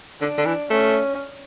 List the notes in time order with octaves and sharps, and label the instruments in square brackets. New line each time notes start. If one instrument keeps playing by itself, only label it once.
[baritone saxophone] D3 [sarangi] D4
[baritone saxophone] D3
E3
[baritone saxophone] A3 [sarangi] C#4